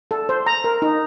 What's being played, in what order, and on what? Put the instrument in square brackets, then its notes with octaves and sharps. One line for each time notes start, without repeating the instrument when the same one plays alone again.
[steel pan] A4
C5
A#5
A#4
D#4